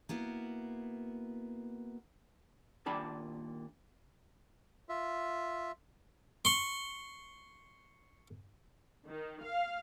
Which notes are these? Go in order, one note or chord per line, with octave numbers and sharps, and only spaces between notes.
A#3 B3 E4 F#4
D#2 A#2 D4 A5 B5
F4 E5
C6 C#6
D#3
F5